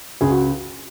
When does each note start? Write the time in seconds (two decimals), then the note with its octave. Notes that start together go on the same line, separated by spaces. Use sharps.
0.21 C#2 G#4
0.30 F#4